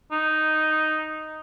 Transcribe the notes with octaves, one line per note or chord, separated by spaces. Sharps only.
D#4